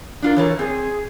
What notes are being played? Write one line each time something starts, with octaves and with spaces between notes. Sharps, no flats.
D4 F4 A#4
E3 A4 A#4 C#5
C4 G#4